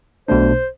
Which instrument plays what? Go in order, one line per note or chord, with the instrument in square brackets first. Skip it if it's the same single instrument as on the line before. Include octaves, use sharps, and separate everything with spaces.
[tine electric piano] B1 B2 A3 D4 [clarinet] C5